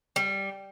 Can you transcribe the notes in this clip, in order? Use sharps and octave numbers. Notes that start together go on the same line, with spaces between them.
G3